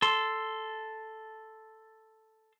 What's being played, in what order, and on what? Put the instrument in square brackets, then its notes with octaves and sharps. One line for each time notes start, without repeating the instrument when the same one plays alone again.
[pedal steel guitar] A4 C6